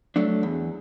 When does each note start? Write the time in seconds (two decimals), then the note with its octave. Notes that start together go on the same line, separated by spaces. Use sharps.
0.16 F#3 A3 D4
0.43 E2